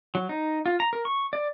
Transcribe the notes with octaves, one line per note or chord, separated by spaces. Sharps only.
F#3
D#4
F4
A#5
A#4
C#6
D5